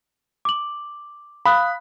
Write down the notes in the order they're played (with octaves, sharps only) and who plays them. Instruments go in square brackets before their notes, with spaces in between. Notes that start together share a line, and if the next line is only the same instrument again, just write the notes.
[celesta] D6 F#7
[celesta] F5 D#6 F#6 [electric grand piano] B5